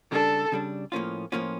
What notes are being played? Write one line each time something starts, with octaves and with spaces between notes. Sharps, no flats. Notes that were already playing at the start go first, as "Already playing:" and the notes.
C#3 G3 D4 A4
C#3 G3 D4
A2 F3 A#3 C#4 F4
A2 F3 A#3 C#4 F4